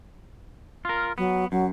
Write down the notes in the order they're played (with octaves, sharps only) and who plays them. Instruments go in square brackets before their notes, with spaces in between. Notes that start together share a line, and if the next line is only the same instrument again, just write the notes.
[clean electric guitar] F4 A#4
[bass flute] F#3 [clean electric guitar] B3
[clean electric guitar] F#2 [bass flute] F#3